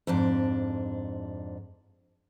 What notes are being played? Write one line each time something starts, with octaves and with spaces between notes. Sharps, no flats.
F2 G#2 D4